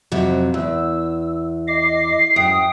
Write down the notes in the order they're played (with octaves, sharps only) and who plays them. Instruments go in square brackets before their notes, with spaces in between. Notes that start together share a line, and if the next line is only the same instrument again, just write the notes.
[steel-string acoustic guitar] F2 C3 F#3
[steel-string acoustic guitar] E2 [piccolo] E6
[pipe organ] D#5 D6 [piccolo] C7
[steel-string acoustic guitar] F#2 [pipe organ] G5 D#6